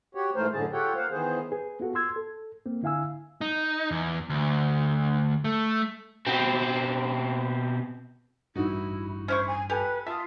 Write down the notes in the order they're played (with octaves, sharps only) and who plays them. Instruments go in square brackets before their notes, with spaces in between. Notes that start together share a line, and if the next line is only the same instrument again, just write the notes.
[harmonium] F#4 G4 C#5
G#2 E3 A3 A#4 C5
F#2 A2 D3 G#4 A5
F4 G4 A4 C#5 F#5 G5
A#3 C5 F5 F#5
D#3 E3 B3 G#4 C5
[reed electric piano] G#4 B4
B3 F4 F#4 A4
C6 E6 G#6
A4
A#3 C4
D3 E4 F5 G#5 E6
[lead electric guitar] D#4
E2
D2
A3
[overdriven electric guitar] B2 C4
[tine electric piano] A1 G2 [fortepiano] D#4 F#4 [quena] E4
[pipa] C#4 E4 C#6 [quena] C5
[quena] G#5
[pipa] G4 [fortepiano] A4 G#5 [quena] B4
[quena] F4 [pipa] E5 [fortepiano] A5 D#6